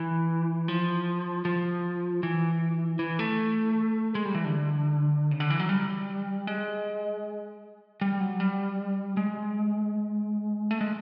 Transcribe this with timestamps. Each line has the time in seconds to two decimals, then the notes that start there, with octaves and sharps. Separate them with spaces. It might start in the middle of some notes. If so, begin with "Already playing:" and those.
Already playing: E3
0.68 F3
1.45 F3
2.23 E3
2.99 E3
3.19 A3
4.15 G#3
4.25 G3
4.35 E3
4.45 D3
5.31 C#3
5.40 D3
5.50 E3
5.59 F#3
5.69 G3
6.47 G#3
8.01 G3
8.20 F#3
8.40 G3
9.17 G#3
10.71 A3
10.81 G#3